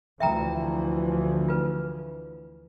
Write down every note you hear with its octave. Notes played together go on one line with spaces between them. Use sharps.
D2 E3 F3 E5 G5 A#5
F4 B4